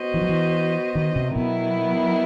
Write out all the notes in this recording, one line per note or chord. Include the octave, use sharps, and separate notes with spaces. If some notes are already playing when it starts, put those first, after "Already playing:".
Already playing: B3 F#4 C5 D#5
E3
F#3
E3
D#3
C3
B2 D#3 F#3 B3 E4